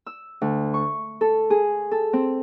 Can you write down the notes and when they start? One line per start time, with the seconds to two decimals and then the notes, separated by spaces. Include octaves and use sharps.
0.06 E6
0.41 D2
0.74 C#6
1.21 A4
1.50 G#4
1.91 A4
2.13 C4